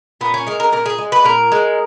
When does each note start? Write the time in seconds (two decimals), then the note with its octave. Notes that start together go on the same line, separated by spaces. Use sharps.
0.21 A#2 B3
0.34 C#4
0.47 G#3 A#4
0.60 A#4
0.72 A#2 A#4
0.86 G#4
0.98 G#3
1.12 B4
1.24 A#2 A#4
1.52 G#3